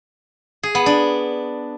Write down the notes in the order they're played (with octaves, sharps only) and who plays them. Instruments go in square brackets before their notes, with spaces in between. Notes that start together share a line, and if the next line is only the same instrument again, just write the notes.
[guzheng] G#4
B3
D4